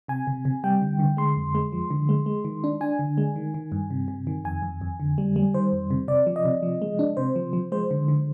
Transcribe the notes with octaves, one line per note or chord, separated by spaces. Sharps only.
C3 G#5
C3
C3
G3 G5
D3
D3
G#3 C6
F2
G#3
F3
D3
G#3
G#3
D#3
D4
D4 G#5
D3
G#3
D#3
D#3
G2
C3
C3
D#3
F2 G#5
F2
F2
D3
G3
G3
D#3 C5
F2
C3
C3 D5
F3
D#5
C3
F3
G#3
D4
C3 C5
F3
F3
G#3 C5
D3
D3